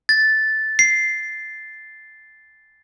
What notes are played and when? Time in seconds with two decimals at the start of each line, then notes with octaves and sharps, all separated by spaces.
0.09 A6
0.79 C7